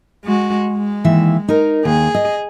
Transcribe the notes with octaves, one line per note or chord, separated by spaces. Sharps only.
G#3 F#4
G#3
D#2 E3 E5
D#4 A#4
D#2 G#4
D#5